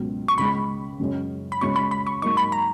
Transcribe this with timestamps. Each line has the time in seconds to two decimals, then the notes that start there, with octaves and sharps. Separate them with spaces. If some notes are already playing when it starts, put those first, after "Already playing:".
Already playing: C#2 B2 F#3 B3
0.28 C#6
0.38 C#2 C#3 G#3 B5
0.99 F#2 C#3 G#3 C#4
1.52 B5
1.61 C#2 C#3 G#3 C#4 F#4 C#6
1.76 B5
1.91 B5
2.07 C#6
2.22 G#2 F#3 A#3 D#4 C#6
2.37 B5
2.52 A#5